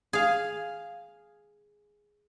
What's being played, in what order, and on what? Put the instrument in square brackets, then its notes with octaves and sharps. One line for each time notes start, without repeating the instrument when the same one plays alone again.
[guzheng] G#4 F5